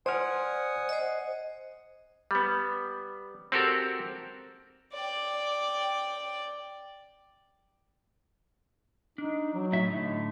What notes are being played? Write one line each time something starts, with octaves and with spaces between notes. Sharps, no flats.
C5 D5 F#5 G#5 D#6 F6
C5 D#5
G3 B3
C4 F#4 G4 A4 A#4
D5 G5
D4 D#4
F#3
A2 E5
A2 D3 D#4